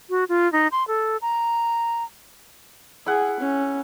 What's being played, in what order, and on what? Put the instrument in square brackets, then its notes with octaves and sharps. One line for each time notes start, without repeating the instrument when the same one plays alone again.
[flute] F#4
F4
D#4
C6
A4
A#5
[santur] E4 F#5 [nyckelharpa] G#4
[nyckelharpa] C#4